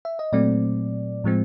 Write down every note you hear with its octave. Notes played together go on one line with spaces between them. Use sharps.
E5
D#5
A#2 F#3 A3 C4 D5
A2 F3 G#3 C4